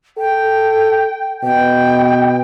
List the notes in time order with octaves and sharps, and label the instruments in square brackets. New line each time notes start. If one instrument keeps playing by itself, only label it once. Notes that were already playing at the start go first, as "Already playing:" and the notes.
[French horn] A4 [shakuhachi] G5
[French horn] B2 [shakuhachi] G5